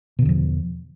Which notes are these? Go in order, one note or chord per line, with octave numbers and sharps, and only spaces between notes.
E2 B2 D3 F3